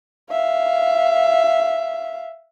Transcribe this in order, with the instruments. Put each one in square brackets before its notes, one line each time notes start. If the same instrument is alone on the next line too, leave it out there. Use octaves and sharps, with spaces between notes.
[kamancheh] E5 F5